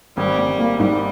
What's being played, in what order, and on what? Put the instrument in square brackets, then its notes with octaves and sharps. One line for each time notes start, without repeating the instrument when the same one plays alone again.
[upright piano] G#1 [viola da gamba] G3
[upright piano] G#1
A#3
[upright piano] G#2 [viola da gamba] G3